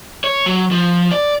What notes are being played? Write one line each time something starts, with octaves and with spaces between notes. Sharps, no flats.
C#5
F#3
F3
D5